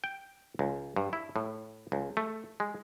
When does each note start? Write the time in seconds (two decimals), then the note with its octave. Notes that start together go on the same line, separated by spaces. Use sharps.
0.04 G5
0.59 C#2
0.96 G2
1.13 E4
1.36 A2
1.92 C#2
2.17 A3
2.60 G#3